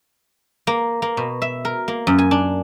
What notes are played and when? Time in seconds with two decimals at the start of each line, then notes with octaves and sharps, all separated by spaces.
0.67 A#3
1.02 A#3
1.17 B2
1.42 E5
1.65 A#4
1.88 A#3
2.07 F#2
2.18 G#5
2.31 D4